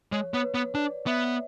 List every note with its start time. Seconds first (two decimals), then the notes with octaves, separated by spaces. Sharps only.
0.12 G#3 C#5
0.34 B3 C#5
0.43 B4
0.54 B3
0.75 D4 D5
1.07 B3 E5